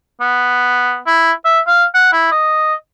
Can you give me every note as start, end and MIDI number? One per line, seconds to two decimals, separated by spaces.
0.21 0.98 59
1.07 1.32 64
1.45 1.60 76
1.67 1.84 77
1.94 2.10 78
2.13 2.29 64
2.32 2.74 75